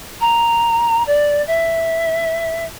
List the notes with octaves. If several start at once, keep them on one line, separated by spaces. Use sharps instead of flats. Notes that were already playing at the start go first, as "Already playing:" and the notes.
A#5
D5
E5